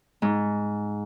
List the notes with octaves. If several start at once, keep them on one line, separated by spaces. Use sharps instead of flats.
G#2